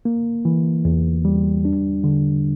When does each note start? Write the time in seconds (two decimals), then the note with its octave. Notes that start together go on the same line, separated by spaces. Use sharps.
0.05 A#3
0.45 E3
0.85 E2
1.25 G3
1.65 D4
2.04 D3